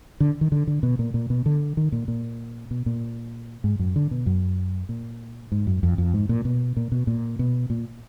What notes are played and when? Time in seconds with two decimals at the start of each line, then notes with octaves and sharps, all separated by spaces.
0.20 D3
0.41 D#3
0.52 D3
0.67 D3
0.83 B2
0.99 A#2
1.14 A#2
1.30 B2
1.46 D3
1.77 D#3
1.92 A#2
2.08 A#2
2.71 B2
2.86 A#2
3.64 G#2
3.79 F#2
3.96 D3
4.11 B2
4.26 F#2
4.89 A#2
5.52 G#2
5.67 F#2
5.83 F2
5.98 F2
6.14 G#2
6.29 A#2
6.45 B2
6.77 A#2
6.92 B2
7.07 A#2
7.39 B2
7.70 A#2